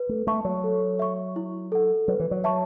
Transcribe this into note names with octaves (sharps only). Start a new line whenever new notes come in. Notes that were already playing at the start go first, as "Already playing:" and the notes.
Already playing: B4
A3
A3 A5 C#6
F#3
A4
E5 C#6
E4
A4 F#5
F#3 B4
E3
F#3
E5 A5 C#6